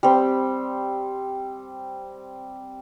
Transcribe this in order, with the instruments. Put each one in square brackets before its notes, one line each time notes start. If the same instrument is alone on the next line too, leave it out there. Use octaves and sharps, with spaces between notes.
[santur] G3 C4